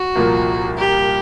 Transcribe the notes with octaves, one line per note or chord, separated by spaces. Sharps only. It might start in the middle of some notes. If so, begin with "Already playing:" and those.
Already playing: F#4
C2 A#2 F3 A#3
G4